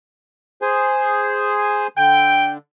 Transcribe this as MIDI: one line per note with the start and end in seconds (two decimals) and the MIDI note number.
0.62 1.87 68
0.62 1.87 72
0.62 1.87 80
1.98 2.58 50
1.98 2.52 79